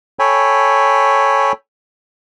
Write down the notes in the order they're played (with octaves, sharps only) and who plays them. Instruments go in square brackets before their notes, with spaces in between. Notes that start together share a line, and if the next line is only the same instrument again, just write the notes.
[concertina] A4 C#5 G5 G#5 B5